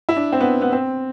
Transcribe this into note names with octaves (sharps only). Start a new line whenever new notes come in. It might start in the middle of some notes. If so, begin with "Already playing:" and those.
E4
D4
C4
B3
B3
C4